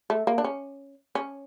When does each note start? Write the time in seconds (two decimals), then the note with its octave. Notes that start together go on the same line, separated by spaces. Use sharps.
0.10 A3
0.27 A#3
0.38 D4
0.44 C#4
1.15 C#4